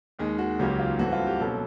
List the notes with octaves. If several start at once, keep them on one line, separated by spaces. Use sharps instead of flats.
D#2 D#3 G#3
F#4
C#2 C#3 F#3 A#3 C#4 G4
F4
G2 E3 A3 C4 F#4
F4
G4
B2 F#3 A#3 C#4 A4